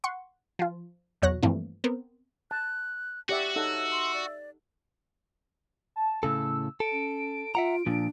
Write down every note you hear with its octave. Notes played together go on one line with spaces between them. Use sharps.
F#5 C6 C#6
F3 F4
B1 E2 F#3 C#5 F#6 A#6
G2 E3 F3 A3 A#3 C4
B3 C4 A#4
A5 F#6
F#4 G4 D5 E5
D#4 A4 C#5 E5 F#5
C6
D5
A5
A2 C#3 A4 E6
A4 D7
C#4
F4 E5 F#5 A#5
A#2 F3 D4